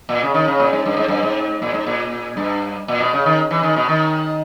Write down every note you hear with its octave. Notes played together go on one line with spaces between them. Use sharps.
A#2
C#3
D#3
C#3
A#2
G#2
G2
G#2
G2
G#2
A#2
G#2
A#2
G2
A#2
B2
C#3
D#3
E3
D#3
B2
D#3